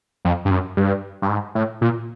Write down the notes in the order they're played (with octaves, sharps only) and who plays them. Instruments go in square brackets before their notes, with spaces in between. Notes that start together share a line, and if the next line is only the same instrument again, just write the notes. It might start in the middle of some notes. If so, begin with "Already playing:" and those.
[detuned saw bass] F2
G2
F#2
G2
G2
G#2
A2
A#2